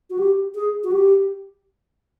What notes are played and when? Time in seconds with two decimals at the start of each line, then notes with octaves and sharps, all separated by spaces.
0.10 F#4
0.18 G4
0.55 G#4
0.84 F#4
0.91 G4